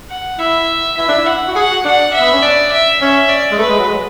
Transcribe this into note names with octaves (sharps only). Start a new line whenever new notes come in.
F#5
E4 E5
E4 E5
D4
E4
F#5
F#4
G#4 F#5
F#4
D4 F#5
E5
B3
C#4
D4 D5
E5
C#4 E5
D5
G#3
A3 B4
G#3
F#3
G#3